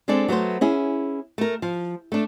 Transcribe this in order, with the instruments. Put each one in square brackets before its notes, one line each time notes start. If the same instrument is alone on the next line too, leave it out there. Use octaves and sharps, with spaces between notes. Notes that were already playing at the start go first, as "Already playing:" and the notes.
[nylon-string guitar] G#3 C4 D4 A4 D5
F#3 A3 B3 C5
C#4 E4 G#4
A3 A#4
F3
A3 D4